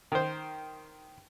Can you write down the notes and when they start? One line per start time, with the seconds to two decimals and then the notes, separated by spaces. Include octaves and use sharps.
0.12 D#3 C5